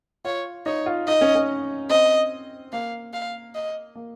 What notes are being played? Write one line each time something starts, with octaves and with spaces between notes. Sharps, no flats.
F4 C#5
D#4 C#5
F4
D#4 D#5
C#4
C#4
C4 D#5
A#3 F5
F5
D#5
A#3